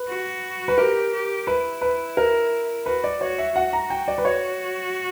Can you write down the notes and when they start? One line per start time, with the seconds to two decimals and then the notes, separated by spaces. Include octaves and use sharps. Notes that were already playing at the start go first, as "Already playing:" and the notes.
Already playing: B4
0.09 F#4
0.68 B4
0.78 G4 A#4
1.13 G4
1.47 E4 B4
1.81 B4
2.17 A#4
2.86 F#4 B4
3.04 D5
3.21 F#4 C#5
3.38 E5
3.56 F#4 F#5
3.73 A#5
3.90 G5
4.08 D5
4.18 B4
4.25 F#4 C#5